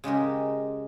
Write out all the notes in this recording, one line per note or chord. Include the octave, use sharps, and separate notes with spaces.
C#3 G#3 G4 A#4